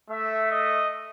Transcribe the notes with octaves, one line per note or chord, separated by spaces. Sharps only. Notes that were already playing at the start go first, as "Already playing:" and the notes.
A3 E5
D#5